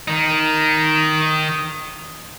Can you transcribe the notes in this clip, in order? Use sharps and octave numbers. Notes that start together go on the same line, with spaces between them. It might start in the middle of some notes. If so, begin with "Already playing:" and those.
D#3 D#4